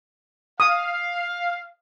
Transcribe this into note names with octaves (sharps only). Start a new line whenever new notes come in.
F5 D#6